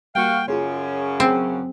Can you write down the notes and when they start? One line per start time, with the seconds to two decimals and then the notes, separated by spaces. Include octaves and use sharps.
0.15 G3 A#3 F#4 F5 G5
0.48 F#2 C#3 C#4 F4 G#4 C6
1.20 F#3 C4 G#4